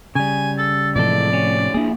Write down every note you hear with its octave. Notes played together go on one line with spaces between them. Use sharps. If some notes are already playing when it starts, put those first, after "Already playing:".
C#3 G3 G#5
A4
A2 C3 E3 F3 G#3 A4 D5
C#4
A#3 D4 E4 G#4